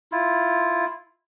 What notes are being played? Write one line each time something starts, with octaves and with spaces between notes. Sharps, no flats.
E4 F4